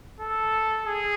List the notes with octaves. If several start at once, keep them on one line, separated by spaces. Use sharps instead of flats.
A4
G#4